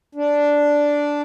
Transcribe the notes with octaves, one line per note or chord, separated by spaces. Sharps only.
D4